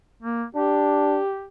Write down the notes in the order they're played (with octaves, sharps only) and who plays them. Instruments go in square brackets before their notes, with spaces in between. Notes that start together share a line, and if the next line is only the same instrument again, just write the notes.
[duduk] A#3
[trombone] D4 [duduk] G4